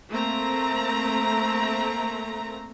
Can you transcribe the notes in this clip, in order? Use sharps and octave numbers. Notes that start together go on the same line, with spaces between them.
A3 A#3 C4 A#5